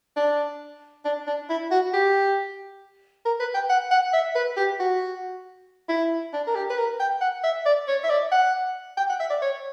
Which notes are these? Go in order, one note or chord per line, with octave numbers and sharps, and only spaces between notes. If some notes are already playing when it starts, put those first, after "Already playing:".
D4
D4
D4
E4
F#4
G4
A#4
B4
G5
F#5
F#5
E5
B4
G4
F#4
E4
D4
A#4
G4
B4
A#4
G5
F#5
E5
D5
C#5
E5
D5
F#5
G5
F#5
E5
D5
C#5